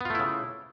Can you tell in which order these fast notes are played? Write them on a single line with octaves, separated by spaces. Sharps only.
B3 F4 A3 E4 C#3